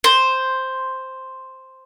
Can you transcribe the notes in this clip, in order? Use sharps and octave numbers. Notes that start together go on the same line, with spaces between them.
C5